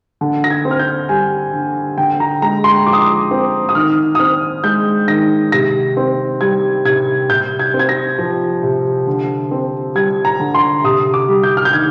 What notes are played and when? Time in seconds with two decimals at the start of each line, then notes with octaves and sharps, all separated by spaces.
0.21 D3
0.44 A#6
0.50 G#6
0.65 C4
0.71 F6
0.79 G6
1.09 G3 G#5
1.54 D3
1.98 D3 G5
2.20 A#5
2.42 G#3 A#5
2.64 C6
2.86 F3 D6
2.93 D#6
3.01 D6
3.31 C4
3.69 D#6
3.75 D#3 F6
4.15 D#6
4.19 C4 F6
4.64 G#3 G6
5.08 D#3 A#6
5.52 C3 A#6
5.97 C4
6.41 G3 G#6
6.85 C3 G#6
7.30 C3 G6
7.59 G#6
7.74 C4
7.79 G#6
7.89 A#6
8.18 F3
8.63 C3
9.07 D3
9.51 C4
9.95 G3 G#6
10.25 A#5
10.40 D3
10.55 C6
10.84 C3 D#6
11.14 D6
11.28 G3
11.43 G6
11.57 F6
11.65 G6
11.73 D#3 G#6